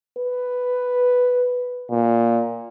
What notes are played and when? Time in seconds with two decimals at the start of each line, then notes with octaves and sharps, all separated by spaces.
0.18 B4
1.90 A#2